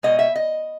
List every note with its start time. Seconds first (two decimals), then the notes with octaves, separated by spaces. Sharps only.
0.03 B2 G#3 D#5
0.19 E5
0.36 D#5